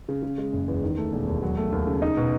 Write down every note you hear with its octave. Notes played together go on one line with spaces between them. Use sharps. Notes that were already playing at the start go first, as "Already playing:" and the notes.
C#3
C#3
G#3
F#1
E2
D#3
A3
E1
D#2
F#3
A3
D#2
C#3
D#4
B2